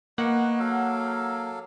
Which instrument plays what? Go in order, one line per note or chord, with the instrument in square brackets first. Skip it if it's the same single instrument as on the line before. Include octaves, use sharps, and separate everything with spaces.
[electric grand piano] A#3 [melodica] B3 D#5 C#6 [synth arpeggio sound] F#5
[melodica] F#3 A4 F5